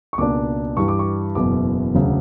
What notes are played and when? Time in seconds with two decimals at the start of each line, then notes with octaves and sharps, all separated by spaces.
0.13 C#6
0.18 C#2 B2 A#3 D4 D6
0.77 G2 E3 G3 C#6
0.88 D6
0.99 C#6
1.35 F#1 E2 B2 D6
1.95 E1 D2 C#3 F#3